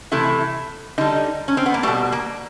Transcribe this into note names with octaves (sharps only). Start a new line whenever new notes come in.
C3 E3 A3 E4
D3 G3 D#4
C#4
C4
B3
A#3
B2 G3 A3
A#3